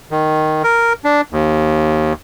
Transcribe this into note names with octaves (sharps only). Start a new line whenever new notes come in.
D#3
A#4
D4
D#2